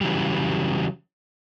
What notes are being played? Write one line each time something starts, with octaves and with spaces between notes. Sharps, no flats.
C#3 E3 F#3 G3